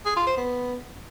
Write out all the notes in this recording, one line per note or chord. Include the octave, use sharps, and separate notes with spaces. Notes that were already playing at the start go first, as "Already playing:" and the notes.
G#4
F4
C5
B3